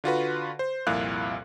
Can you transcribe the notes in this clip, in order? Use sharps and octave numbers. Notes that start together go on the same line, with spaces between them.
D3 F4 F#4 B4
C5
C2 F2 A#2 E4 F5 F#6